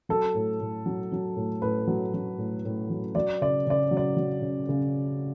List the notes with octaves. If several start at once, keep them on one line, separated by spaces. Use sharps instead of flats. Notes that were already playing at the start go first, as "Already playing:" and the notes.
F#3 A4
A2
A2
F#3
F#3
A2
A2 B4
F#3
F#3
A2
A2
F#3
F#3 D5
C#3 D5
C#3 D5
F#3
D5
F#3
C#3
C#3